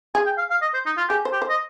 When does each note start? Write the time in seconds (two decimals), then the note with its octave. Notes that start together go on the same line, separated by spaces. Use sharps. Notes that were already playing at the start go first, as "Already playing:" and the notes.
0.15 G#4 G#5
0.26 G5
0.38 F5
0.50 F5
0.62 D#5
0.74 C5
0.86 D#4
0.97 F4
1.09 G4 G#4
1.25 C5
1.33 G4
1.42 C5
1.49 D#5